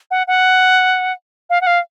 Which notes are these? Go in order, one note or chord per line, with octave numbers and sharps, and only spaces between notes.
F#5
F#5
F5
F#5
F5